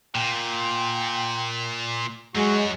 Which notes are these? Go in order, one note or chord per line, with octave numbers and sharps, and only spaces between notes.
A#2 G5
F#2 F#3 G#3 F#4